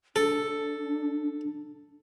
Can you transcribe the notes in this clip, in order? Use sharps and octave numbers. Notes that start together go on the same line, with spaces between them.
D4 A4